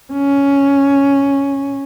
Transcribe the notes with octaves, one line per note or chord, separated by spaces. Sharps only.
C#4